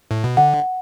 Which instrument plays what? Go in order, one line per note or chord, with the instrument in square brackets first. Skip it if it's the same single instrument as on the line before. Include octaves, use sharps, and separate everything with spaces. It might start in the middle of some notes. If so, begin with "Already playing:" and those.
[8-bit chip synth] A2
B2
[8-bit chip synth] D3 [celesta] F#5